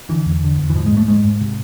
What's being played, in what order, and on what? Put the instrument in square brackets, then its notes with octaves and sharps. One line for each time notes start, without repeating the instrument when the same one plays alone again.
[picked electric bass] D3 E3
E2
D3
E2
E3
G#2 F3
G#3
G#2 A3
G#2 G#3
G#2
C3